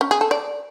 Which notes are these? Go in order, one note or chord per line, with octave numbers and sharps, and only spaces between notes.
C#4
G#4
A4
D5